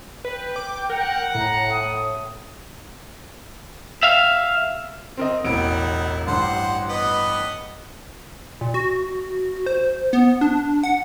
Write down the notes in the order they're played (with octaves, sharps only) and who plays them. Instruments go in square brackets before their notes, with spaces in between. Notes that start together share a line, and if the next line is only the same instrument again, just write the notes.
[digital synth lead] B4 [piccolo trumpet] G5
[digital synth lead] D6
[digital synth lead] A#4 [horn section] F#5
[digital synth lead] A2 [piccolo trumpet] A#5
[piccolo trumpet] D#6
[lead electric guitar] E5 F5
[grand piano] C4 A#4 D#5
[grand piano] E1 A1 D7 [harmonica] D#4 E4 F#5
[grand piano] A1 G2 [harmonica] C5 F#5 C6
[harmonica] B3 B4 D#5
[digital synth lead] A#2
F#4
C5
B3
D4
F#5